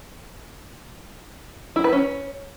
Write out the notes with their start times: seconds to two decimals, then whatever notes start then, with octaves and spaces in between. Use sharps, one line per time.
1.76 E4
1.84 B4
1.93 C#4